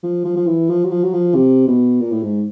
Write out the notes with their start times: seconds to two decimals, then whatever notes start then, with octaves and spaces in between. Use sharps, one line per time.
0.04 F3
0.25 F3
0.36 F3
0.47 E3
0.70 F3
0.84 F#3
0.91 F3
1.03 F#3
1.13 F3
1.35 C3
1.68 B2
2.01 A#2
2.12 A2
2.23 G#2